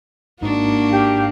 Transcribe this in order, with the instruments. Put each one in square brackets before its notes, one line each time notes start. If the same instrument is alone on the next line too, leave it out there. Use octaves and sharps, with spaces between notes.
[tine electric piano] G#1 G#2 D#4 [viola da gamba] A#3 D4 F#4
[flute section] G4 F5